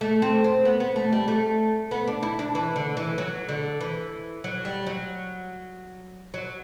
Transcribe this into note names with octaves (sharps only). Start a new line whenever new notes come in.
A3
C4
C4
B3
B3
A3
G3
A3
B3
D4
E4
D4
E3
D3
E3
F#3
D3
E3
F#3
G3
F#3
F#3